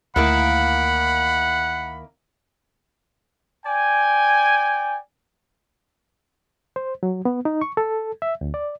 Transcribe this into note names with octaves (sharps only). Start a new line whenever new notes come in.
D2 D#3 A3 A#3 E4 F#5 B5
D5 G5 G#5
C5
F#3
B3
D#4
C#6
A4
E5
D2
D5